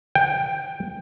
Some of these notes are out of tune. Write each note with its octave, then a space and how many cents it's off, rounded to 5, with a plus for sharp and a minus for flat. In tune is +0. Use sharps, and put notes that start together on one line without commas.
G5 +10